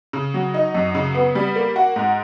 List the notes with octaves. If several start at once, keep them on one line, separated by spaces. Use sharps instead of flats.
C#3
F#3
D#4
F#2
C#3
B3
G3
A#3
F#4
G#2